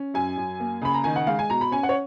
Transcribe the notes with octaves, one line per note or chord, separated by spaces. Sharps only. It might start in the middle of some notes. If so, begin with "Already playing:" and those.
Already playing: C#4
F#2 G#5
F#2
A#3
C#3 B5
A#5
D#3 G#5
F#5
G#3 F5
G#5
B2 A#5
B5
C#4 G#5
F#5
C#5